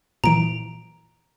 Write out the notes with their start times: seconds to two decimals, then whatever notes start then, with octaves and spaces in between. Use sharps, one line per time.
0.24 A#2 E3 A#5 D7